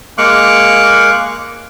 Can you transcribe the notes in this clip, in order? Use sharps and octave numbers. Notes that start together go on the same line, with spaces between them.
G#3 A#3 F5 C#6 D6 F#6